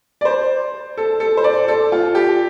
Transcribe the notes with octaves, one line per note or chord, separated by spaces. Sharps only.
D5
C5
A4
A4
C5
D5
A4
F4
G4